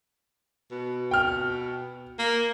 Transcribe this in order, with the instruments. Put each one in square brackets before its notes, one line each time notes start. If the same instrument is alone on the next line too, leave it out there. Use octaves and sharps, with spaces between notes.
[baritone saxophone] B2
[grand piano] G5 F6
[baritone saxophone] A#3